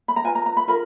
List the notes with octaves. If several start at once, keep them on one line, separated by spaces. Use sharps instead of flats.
B5
A#5
F4 B4 G#5
A#5
A#5
B5
F4 A#4 B5